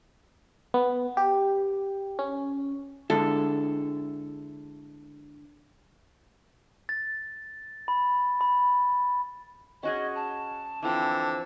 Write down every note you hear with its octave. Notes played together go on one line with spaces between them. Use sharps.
B3
G4
C#4
D3 G#3 E4 A4
A6
B5
B5
C#4 F#4 G#4 D#5
A5
D3 E3 F3 C4